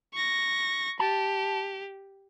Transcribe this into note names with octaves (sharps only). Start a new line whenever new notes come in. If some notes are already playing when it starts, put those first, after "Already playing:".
C#6 A#6
G4 A5